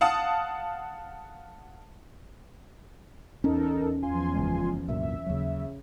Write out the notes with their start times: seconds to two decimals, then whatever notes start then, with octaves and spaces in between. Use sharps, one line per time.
0.01 F5 F#5 A5 D#6
3.44 E2 C#4 D#4 A4 A#4
4.02 E2 F3 F4 G#5 C6
4.35 F#1 C#3 G#3
4.88 C2 F#2 A#2 E5
5.26 D#2 C#3 F#3